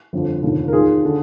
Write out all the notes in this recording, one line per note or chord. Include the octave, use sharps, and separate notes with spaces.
G1 F2 D3 F3
F1 D#2 D3 F3
A#4
D#2 D#3 F4 G#4
D3